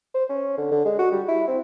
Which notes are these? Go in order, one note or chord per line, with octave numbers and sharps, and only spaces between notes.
C5
C#4
D3
D3
G#3
F#4
G3
E4
C4